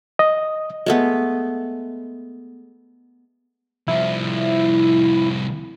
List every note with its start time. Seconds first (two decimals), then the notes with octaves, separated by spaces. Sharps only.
0.19 D#5
0.86 G#3 A3 B3
3.88 C2 F3 E4